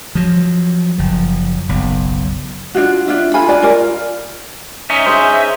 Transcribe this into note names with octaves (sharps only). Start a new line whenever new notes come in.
F3 F#3
F#1 F3
F#1 B1
D4 D#4 F4 F#4
D4 F4 E5
F4 A4 G#5 B5
D4 D5 G#5
F4 A#4 D5
C#4 D#4 E5
G#4 C5